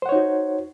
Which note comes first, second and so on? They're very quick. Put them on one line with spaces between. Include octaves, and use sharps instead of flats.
C5 F#5 C#5 D#4 F#4